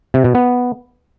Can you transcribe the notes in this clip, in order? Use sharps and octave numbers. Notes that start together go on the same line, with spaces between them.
C3
B2
B3